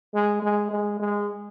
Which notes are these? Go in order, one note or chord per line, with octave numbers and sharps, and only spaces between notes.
G#3
G#3
G#3
G#3